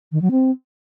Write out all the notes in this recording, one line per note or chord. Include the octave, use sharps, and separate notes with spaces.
D#3
F#3
C4